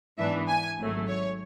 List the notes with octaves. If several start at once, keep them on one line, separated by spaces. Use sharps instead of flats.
G#2 E3 B3 D4 E5
G#5
G#1 G#2 F#3 A3
C#5